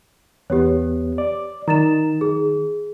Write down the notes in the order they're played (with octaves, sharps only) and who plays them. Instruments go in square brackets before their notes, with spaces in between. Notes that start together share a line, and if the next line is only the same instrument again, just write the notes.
[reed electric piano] E2 B3 [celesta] G4 C#5
[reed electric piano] D5
[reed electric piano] D#3 [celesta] A#5 A6 E7
[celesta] G#4